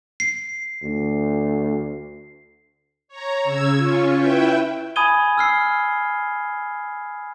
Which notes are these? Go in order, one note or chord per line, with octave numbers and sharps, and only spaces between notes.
C7
D2
C#5 A#5
C#3 E6 G#6
C#4 F4 C#5
E4 B4 E5 G5
G#5 B5 D#6 G#6 D#7 G7
E6 F6 C7